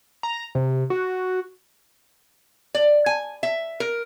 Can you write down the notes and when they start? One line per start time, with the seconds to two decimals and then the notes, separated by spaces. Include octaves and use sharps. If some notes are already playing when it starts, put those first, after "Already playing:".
0.23 A#5
0.55 C3
0.90 F#4
2.75 D5
3.06 G#5
3.43 E5
3.80 A#4